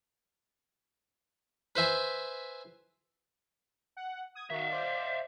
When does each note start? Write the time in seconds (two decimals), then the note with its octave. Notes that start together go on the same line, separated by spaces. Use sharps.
1.76 B4 C5 E5 G#5
3.97 F#5
4.35 D#6 G#6
4.50 D#3 F#4 E5 F5
4.69 C5 D5